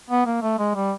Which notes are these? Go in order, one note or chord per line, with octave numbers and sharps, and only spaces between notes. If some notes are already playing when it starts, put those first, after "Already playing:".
B3
A#3
A3
G#3
G3